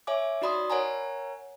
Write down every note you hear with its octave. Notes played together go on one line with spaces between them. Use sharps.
C#5 E5 G#5 D6
D#4 F#4 D5 B5 C6 D#6
A#4 C#5 F#5 G#5 A#5